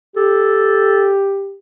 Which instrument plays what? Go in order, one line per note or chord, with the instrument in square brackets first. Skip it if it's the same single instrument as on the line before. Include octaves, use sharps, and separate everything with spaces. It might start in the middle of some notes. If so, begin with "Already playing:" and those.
[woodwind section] G4 [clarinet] A4